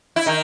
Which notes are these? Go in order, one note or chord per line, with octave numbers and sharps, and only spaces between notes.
E4
D#3 D#4